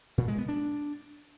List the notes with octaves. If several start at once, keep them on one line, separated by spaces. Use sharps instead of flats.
A#2
G#3
B3
D4